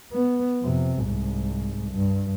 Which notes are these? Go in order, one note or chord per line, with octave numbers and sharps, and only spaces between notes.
B3
F2 C3
C2 G#2
G2